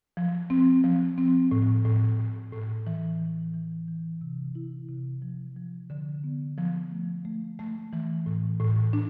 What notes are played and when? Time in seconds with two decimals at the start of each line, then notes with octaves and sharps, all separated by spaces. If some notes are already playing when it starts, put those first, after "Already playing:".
0.17 F3
0.50 C4
0.84 F3
1.18 C4
1.51 A2
1.85 A2
2.19 A2
2.53 A2
2.87 E3
3.20 E3
3.54 E3
3.88 E3
4.21 C3
4.55 E4
4.89 C3
5.22 F3
5.56 F3
5.90 D3
6.24 B3
6.58 F3
6.91 A3
7.25 A3
7.59 A3
7.93 E3
8.26 A2
8.60 A2
8.93 D4